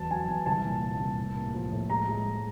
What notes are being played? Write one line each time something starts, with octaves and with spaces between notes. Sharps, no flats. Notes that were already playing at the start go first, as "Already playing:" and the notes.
Already playing: E2 F#3 A5
F#3 G#5
E2
C2 A5
A#2
A#2
C2
A2
A#3
F3
A2
G#3 A#5
G#3
G#3